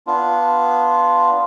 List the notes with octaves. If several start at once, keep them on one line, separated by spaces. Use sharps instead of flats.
B3 D4 F4